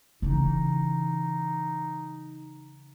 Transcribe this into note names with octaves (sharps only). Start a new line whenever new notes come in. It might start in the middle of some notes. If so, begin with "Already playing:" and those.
C#3 E3 D#4